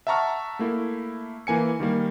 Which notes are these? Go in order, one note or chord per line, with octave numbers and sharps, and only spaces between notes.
E5 F#5 A5 A#5 C#6 F6
A3 A#3 E4
E3 A#3 G#5 C#7
D#3 G3 A#3